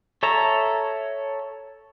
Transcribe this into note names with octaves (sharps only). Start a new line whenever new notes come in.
A4 C#5 E5 A5 A#5